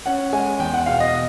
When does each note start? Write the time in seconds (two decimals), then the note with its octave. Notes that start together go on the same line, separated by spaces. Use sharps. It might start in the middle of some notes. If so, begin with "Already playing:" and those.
0.06 C#4 F#5
0.33 G#3 G#5
0.59 E2 G5
0.74 F#5
0.86 B2 F5
1.00 D#5